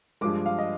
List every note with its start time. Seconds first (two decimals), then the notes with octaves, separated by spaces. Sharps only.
0.21 G2 F3 G#3 D6
0.46 F5
0.59 D#5